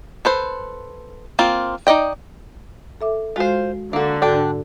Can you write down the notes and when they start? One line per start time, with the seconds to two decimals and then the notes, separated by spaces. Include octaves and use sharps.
0.25 A4 B4 C5
1.39 A#3 C4 F4
1.87 D#4 D5 D#5 G5
3.01 A4 E5 D6
3.36 G#3 F4 F#4 C5 F5
3.93 D3 A#3 F#4
4.22 G#2 D4 F#4 A4 G5